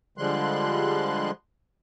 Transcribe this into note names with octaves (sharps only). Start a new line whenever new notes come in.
D3 F3 G3 G#3 C6 F#6